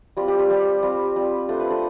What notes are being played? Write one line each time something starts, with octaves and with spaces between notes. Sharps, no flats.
G3 C4 F4 G4
G4
F4
G3 C4 F4 G4
G3 C4 F4
G3 C4 F4
A3 D4 F4 A4 C5
B4 D5
A4 C5